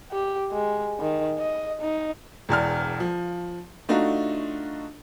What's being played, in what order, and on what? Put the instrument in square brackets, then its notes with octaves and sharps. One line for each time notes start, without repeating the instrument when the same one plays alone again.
[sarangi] G4
G#3
D#3
D#5
D#4
[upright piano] E1 E2 D5 F6
F3
A3 D4 D#4 F4 F#4